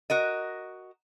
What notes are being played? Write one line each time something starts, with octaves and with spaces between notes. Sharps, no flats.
F#4 A#4 D#5